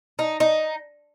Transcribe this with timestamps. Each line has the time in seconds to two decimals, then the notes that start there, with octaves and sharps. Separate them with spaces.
0.19 D#4
0.40 D#4